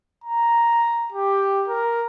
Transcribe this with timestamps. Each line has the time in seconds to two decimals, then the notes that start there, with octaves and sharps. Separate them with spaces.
0.24 A#5
1.12 G4
1.68 A#4